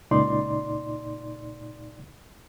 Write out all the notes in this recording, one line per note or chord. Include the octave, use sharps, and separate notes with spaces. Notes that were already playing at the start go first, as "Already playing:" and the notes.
C#2 A#2 D#4 D5 C6